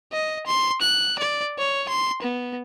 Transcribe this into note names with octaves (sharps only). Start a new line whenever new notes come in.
D#5
C6
F#6
D5
C#5
C6
B3